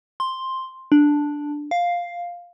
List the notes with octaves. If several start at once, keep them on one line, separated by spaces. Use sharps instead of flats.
C6
D4
F5